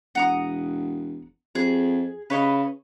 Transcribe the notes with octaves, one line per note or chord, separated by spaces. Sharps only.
E1 F#5 A#5 D#6
F2 G#4
C#3 B4 C#5 D#5